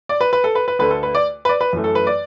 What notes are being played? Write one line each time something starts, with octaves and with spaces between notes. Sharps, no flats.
D5
B4
B4
A4
B4
B4
D2 D3 A3 B4
A4
B4
D5
B4
D5
B4
F#2 E3 A3
A4
B4
D5